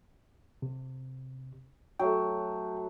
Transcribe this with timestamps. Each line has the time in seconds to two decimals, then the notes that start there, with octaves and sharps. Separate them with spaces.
0.62 C3
2.00 F#3 A3 G5